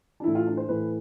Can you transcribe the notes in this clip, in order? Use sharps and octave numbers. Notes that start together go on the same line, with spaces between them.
D4
A2 E3 E4
F4
D4
C5
A2 E3 B4